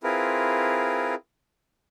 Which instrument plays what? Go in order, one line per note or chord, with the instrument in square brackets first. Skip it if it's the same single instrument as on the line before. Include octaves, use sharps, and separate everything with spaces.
[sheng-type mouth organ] C4 E4 F4 G#4 A#4 B4